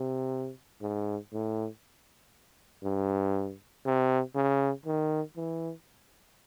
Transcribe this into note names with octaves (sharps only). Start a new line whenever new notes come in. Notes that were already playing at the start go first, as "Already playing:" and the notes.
Already playing: C3
G#2
A2
G2
C3
C#3
D#3
E3